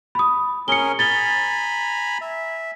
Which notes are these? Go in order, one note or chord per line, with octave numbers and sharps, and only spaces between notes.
B5 D#6
C#4 G#4 A#4 C#7 G7
G#5 A#5 B5 A6 G7
E5